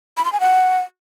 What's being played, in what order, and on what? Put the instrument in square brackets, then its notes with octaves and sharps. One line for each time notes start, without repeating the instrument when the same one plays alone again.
[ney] B5
C6
G#5
F#5